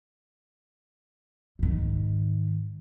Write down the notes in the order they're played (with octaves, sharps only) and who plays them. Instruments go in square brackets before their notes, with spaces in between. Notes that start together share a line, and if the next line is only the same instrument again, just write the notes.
[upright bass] G#2 D#3